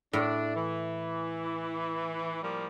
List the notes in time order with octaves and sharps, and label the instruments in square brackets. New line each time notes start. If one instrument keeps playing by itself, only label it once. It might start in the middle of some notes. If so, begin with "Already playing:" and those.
[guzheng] A2 [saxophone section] D4
[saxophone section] E3
F3 G3 A#3